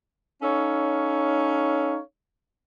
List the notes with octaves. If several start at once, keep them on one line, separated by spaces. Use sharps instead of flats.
C#4 D#4 A4 C#5 F5